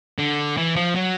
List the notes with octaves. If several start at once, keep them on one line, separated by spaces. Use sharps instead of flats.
D3
E3
F3
F#3